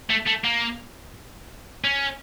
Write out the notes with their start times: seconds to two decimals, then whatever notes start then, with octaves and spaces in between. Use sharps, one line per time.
0.10 A3
0.26 A3
0.44 A#3
1.84 C#4